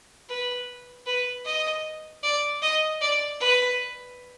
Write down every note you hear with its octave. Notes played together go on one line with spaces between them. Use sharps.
B4
B4
D#5
D5
D#5
D5
B4